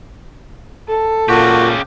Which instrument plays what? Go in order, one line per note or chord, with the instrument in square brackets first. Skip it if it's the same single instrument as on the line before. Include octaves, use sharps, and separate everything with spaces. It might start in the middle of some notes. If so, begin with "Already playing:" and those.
[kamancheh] A4
[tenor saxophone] A#2 [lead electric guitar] C#3 G4 [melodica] F#4